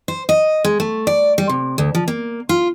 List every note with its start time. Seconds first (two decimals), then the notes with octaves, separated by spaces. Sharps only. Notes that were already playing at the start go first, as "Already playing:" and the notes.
0.08 C5
0.29 D#5
0.64 G#3
0.80 A3
1.07 D5
1.38 G3
1.49 C3
1.78 D2
1.95 F3
2.08 A#3
2.49 F4